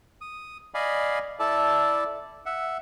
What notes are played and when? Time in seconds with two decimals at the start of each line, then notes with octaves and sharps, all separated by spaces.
0.21 D#6
0.74 D5 D#5 F5 G#5 B5
1.39 E4 A4 D5 A5
2.46 E5 F#5